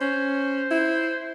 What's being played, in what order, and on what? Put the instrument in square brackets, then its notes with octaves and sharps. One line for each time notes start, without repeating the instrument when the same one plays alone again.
[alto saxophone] C#4 [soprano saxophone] C5
[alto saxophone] E4